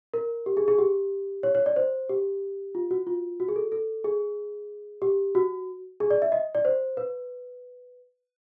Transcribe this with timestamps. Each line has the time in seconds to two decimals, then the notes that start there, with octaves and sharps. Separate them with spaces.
0.14 A#4
0.46 G4
0.57 G#4
0.68 G#4
0.79 G4
1.43 C#5
1.55 C#5
1.66 D5
1.76 C5
2.09 G4
2.75 F4
2.91 F#4
3.07 F4
3.40 F#4
3.48 G#4
3.56 A4
3.72 A4
4.04 G#4
5.02 G4
5.35 F#4
6.00 G#4
6.10 D5
6.22 E5
6.32 D#5
6.55 D5
6.65 C5
6.97 B4